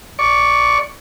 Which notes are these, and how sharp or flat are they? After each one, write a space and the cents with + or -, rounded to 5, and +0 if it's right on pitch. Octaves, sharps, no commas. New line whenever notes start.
D5 -10 C#6 +0